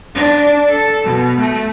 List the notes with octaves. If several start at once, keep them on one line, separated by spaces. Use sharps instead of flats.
D4
A4
B2
A3